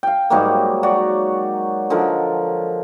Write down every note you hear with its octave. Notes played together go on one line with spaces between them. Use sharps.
F5 G5
G#2 F#3 G3 A#3
F#4 C#5 D5
D3 F3 G#3 A#4